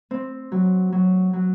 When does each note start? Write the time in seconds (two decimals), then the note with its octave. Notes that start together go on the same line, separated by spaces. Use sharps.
0.11 C4
0.52 F#3
0.92 F#3
1.33 F#3